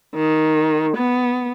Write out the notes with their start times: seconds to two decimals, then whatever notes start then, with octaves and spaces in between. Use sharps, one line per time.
0.15 D#3
0.97 B3